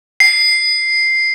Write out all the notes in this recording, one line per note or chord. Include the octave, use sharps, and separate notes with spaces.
C7